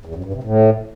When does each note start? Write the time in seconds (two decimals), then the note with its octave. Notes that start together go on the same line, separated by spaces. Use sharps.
0.05 E2
0.15 F#2
0.24 G2
0.34 C3
0.43 A2